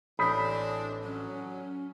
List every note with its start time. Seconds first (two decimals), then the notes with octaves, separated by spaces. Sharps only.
0.19 A1 E3 G#3 C4 D4 B5 D#6 B6
1.03 F#3 C#4